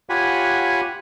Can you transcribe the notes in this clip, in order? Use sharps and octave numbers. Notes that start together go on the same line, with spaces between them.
F4 G4 C#5 F#5 G#5 B5